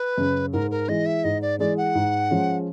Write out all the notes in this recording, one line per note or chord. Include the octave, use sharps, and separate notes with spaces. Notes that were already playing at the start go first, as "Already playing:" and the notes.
Already playing: B4
F#2 C#3
G#2 A#4
A#4
E3 G#3 D#5
E5
G#2 D#5
D5
E3 G#3 D5
F#5
G#2
F3 G#3 C#4